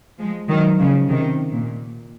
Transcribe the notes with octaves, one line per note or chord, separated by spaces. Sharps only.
F3 G#3
D#3 F#3
C#3 F3
C3 D#3
A#2